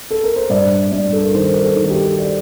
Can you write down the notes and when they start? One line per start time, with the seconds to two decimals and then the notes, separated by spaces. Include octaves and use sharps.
0.11 A4
0.24 A#4
0.36 C5
0.50 G2 D5
0.92 G2 D5
1.13 A4
1.24 A#4
1.34 D#3 C5
1.53 A#4
1.62 A4
1.76 D#3
1.85 A4
1.91 G4
2.18 D5